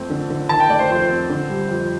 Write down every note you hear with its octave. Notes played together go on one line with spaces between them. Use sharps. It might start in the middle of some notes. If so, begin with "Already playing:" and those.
Already playing: F2 A3 C4
D3
D3
D#3 A5
G5
A3 D5
C5
F2 C5
C4
D3
G3
F2